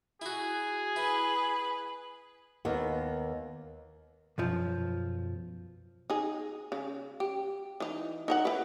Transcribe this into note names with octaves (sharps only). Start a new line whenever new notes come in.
E4 F#4 G#4
E4 B4
D#2 A#3 B3
B1 F#2 F3
D#4 G#4
C#3
G4
E3 D#4
D#4 A#4 F#5
E4 B4